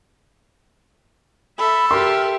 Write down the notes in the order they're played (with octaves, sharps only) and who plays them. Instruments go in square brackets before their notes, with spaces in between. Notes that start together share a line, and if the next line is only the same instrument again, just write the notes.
[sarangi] A4 [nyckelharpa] E5 [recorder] B5
[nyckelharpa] G4 E5 [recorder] A#4 [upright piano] C6